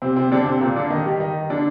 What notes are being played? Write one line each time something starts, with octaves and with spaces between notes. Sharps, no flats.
C3 C4
C3 C4
D3 D4
C3 C4
A#2 A#3
D3 D4
D#3 D#4
G3 G4
D#3 D#4
D3 D4